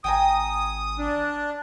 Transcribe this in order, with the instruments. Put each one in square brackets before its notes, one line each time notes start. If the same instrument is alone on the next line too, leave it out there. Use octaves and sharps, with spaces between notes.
[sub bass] G#1 [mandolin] G5 G#5 A#5 [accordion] D#6
[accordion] D4